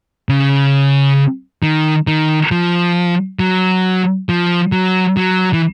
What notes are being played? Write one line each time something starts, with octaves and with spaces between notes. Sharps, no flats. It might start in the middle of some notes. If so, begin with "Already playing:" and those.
C#3
D#3
D#3
F3
F#3
F3
F#3
F#3
E3